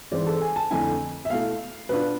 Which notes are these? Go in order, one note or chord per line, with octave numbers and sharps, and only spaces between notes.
G#2 E3 G#3 C4 D5
A4
G#5
A5
F2 D3 A3 E4 G#5
E5
B2 A3 E4 F5
B2 B3 D4 F4 B4